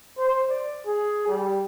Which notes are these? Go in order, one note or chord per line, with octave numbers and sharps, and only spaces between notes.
C5
D5
G#4
G3